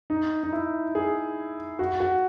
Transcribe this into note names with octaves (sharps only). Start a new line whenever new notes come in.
D#4
D#4
E4
G#4
F#4
F#4